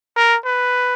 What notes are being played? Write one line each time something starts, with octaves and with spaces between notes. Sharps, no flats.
A#4
B4